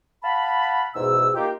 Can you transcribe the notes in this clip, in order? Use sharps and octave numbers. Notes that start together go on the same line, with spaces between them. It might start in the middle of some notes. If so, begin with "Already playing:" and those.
F5 F#5 A5 B5
E2 G#2 B2 E6
A#3 D#4 F4 G4